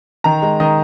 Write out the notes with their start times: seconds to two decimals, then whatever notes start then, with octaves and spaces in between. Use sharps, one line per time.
0.24 D#3 A#5
0.42 G#3
0.60 D#3 D#5